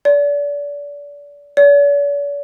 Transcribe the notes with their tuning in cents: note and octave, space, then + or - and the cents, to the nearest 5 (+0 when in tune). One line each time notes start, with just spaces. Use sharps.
D5 -30
D5 -45